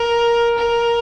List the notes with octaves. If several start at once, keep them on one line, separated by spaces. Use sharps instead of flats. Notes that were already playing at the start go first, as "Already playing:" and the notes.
Already playing: A#4
A#4